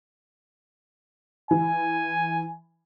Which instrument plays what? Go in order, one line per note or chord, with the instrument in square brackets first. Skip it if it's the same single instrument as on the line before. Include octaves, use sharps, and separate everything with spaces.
[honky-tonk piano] E3 [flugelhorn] G#5